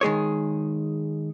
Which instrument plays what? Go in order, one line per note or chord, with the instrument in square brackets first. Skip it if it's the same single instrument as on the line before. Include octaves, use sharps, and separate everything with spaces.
[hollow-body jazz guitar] D#3 G#3 G#4 C#5